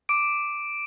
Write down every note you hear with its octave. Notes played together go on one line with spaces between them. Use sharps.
D6 D7